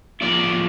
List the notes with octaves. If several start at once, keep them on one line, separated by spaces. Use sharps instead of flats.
A2 F3 B3 E4 D5